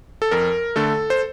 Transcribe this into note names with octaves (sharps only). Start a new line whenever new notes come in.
A4
F2 A#4
D3 A3 A4
C5